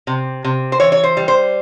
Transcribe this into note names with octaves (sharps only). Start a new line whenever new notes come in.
C3
C3
C5
E3 C#5
C#5
C5
G3
C5